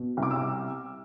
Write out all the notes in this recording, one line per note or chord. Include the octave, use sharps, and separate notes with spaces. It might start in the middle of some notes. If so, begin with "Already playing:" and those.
Already playing: B2
C2
D6
E6